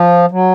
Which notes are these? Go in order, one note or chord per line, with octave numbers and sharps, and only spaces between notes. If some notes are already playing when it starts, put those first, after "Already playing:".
Already playing: F3
F#3